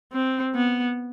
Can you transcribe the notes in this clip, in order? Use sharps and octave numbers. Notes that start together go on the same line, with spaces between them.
C4
B3